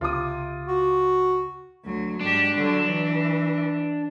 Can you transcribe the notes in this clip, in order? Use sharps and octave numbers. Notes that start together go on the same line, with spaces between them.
C#2 C3 F4 D6 D#6
F#4
D2 F#3
G#2 D4 G4
D3 F#3
E3